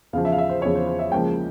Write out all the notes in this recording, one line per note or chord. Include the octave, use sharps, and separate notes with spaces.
E2 C#3 F3 F5
E5
F5
E5
C5
E2 C#3 F3 C#5
C5
C5
E5
C#2 C#3 F3 A#3 G5